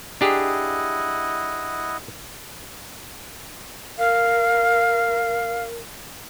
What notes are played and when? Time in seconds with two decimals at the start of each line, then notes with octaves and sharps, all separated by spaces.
0.21 D4 E4 G4 G#4 D#5 F#5
3.98 A#4 F5